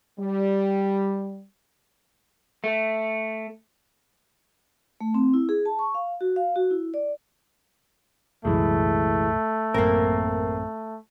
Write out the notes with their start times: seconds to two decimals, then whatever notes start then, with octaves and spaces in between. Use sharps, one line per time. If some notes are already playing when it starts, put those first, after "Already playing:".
0.19 G3
2.64 A3
5.01 A3
5.14 C4
5.34 E4
5.49 G#4
5.66 A5
5.79 C#6
5.95 F5
6.21 F#4
6.36 F5
6.56 F#4
6.71 E4
6.94 D5
8.45 C2 F#2 A#2 E3 G#3 A3
9.74 A1 F#2 A#3 C4 A#4